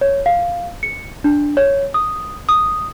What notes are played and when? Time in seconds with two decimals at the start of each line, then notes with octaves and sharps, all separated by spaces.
0.01 C#5
0.26 F5
0.83 C#7
1.24 D4
1.57 C#5
1.94 D#6
2.49 D#6